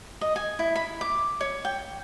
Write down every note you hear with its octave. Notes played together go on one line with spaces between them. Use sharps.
D#5
G#5
E4
B5
D6
C#5
G5